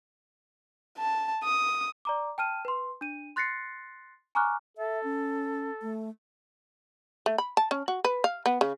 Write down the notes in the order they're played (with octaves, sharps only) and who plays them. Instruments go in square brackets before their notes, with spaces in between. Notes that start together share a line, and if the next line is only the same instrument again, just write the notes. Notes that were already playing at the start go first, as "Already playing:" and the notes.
[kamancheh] A5
D#6
[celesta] D5 A#5 D6
G5 A5 F6 D#7
B4 C6
D4 D#7
C6 F#6 A6 A#6 C7 C#7
G#5 A#5 C#6 D6 F6 F#6
[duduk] A4 [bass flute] E5
[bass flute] C#4
A3
[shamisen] A3
B5
A5
C#4
F#4
B4
F5
B3
C#3